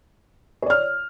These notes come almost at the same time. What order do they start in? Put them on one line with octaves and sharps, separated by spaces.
C#5 D5 F6